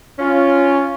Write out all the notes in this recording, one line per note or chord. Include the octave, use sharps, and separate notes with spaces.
C#4 F4